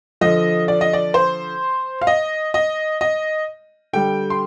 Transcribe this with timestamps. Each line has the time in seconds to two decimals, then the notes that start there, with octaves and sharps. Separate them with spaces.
0.21 D3 F3 D#5
0.68 D5
0.81 D#5
0.93 D5
1.14 C5
2.01 F5
2.07 D#5
2.54 D#5
3.01 D#5
3.93 D3 G3 G5
4.30 C6